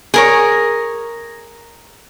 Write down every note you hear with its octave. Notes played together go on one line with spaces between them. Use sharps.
G#4 A#4 C#5